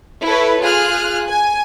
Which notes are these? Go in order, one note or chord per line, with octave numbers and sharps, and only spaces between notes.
E4 A4 B4 C#5
F4 G#4 F6 F#6
G#5